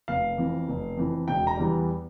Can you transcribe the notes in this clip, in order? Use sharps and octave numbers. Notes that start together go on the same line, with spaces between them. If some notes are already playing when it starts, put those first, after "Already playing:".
F1 F5
F2 E3
F1
F2 E3
E1 G5
A#5
E2 E3 G3